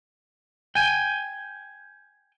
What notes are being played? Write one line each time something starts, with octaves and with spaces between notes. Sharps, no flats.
G5 G#5